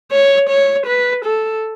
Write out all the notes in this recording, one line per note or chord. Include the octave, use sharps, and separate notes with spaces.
C#5
C#5
B4
A4